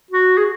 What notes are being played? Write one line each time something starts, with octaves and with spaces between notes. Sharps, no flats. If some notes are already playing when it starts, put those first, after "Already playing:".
F#4
G#4